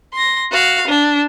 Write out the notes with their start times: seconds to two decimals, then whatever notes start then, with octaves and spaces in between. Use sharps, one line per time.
0.13 C6 A#6
0.52 F#4 F5
0.87 D4